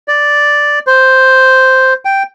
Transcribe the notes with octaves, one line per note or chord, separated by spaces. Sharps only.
D5
C5
G5